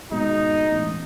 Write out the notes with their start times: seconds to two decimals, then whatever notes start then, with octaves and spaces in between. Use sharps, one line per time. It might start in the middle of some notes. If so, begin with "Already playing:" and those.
0.12 G#1 B2 G#3 D#4
0.70 E1 A1